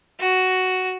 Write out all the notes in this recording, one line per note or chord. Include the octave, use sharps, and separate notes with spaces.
F#4